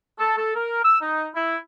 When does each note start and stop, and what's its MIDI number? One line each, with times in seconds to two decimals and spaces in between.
0.18 0.35 69
0.36 0.53 69
0.55 0.83 70
0.83 0.96 88
1.01 1.26 63
1.35 1.56 64